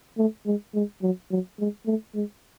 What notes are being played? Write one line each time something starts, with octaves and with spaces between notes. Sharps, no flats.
A3
G#3
G#3
F#3
F#3
G#3
A3
G#3